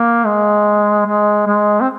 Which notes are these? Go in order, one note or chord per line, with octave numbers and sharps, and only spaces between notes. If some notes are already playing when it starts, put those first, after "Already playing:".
Already playing: A#3
G#3
G#3
G#3
C4